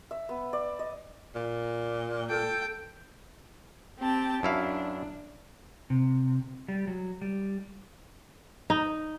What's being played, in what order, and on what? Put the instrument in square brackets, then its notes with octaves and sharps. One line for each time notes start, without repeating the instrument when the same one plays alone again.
[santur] E5
B3
D5
D#5
[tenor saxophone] A#2
[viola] A4 G5
[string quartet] C4 G4 A5
[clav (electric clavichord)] F#2 E4 F5 [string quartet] D4
[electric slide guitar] C3
G3
F#3
G3
[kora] D#4